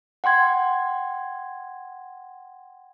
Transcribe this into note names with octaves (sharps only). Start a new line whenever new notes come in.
F#5 G5 C6 G#6